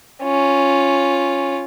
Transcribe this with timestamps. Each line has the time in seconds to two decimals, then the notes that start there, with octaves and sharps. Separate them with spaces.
0.23 C#4 F4